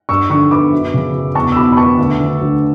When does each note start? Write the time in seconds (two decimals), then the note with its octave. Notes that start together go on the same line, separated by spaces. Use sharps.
0.09 G2 C#6 E6
0.30 D3 C#6 E6
0.51 B3 B5 D6
0.73 F#2
0.94 C#3
1.14 F#2
1.35 E2 A5 C#6
1.52 E6
1.56 B2 B5 D6
1.72 B5
1.77 B3 A5 C#6
1.99 D2
2.20 D3
2.41 D2